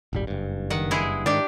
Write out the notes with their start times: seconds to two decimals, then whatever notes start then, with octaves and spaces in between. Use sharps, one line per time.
0.13 D#1 G#1 G3
0.27 F#1 G2
0.70 D#3 F#5
0.91 G#3 E4 G#4
1.26 G#2 D#3 D4 G4